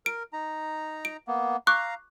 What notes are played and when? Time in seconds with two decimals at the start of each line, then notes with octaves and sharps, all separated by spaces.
0.06 A#4 D7
0.33 D#4 A#5
1.05 D7
1.28 A#3 B3
1.67 F5 A#5 C#6 D6 F#6